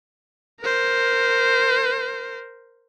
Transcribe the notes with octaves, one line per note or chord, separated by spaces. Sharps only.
A#4 C5